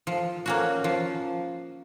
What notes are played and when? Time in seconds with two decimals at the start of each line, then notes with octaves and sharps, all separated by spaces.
0.07 F3
0.46 A#3 C#4 F#4
0.84 F3